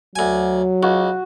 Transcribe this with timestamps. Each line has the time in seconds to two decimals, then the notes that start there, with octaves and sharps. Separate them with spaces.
0.16 D2 F#3 G#5
0.83 C#2 F#4